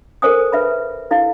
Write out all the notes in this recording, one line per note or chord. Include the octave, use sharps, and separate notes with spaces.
A4 A#4 C5 G#5 D#6
B4 E5 B5
E4 A4 F5